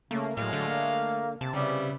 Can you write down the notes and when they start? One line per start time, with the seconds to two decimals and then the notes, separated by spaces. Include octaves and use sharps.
0.11 C#3 A3 A#3
0.37 A2 F#3 G#3 F5
0.53 D3 A3
0.67 A#3
1.41 C3 A5
1.54 C#3 G3 B3 E4 D5